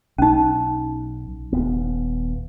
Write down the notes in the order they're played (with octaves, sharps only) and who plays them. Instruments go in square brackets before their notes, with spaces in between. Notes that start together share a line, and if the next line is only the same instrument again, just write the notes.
[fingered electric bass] B1 [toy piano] C#4 D#4
[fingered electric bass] D#1 B3